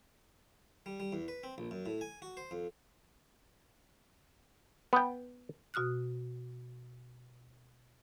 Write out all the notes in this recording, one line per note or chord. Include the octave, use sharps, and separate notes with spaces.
G3
G3
E2
B4
C4
A#1
F#2
A2
G#5
F#4
C5
F2
B3 G5
B2 F#4 D#6 F6 F#6